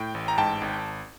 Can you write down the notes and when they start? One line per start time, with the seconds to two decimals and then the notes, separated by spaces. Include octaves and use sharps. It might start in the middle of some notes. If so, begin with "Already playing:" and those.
Already playing: A2 G5
0.14 A1
0.28 A#5
0.38 G#2 G5 A5
0.62 G#1